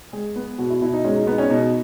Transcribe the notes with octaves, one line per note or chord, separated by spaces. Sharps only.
G#3 G#4
B3
B2 F#4
E4
B2 E4
D#4
G#3 C#4
D#4
B3 D#4
C#4
B2 D#4